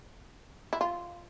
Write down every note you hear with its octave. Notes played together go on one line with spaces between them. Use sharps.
E4
F4